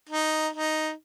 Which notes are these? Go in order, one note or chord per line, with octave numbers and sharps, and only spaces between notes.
D#4
D#4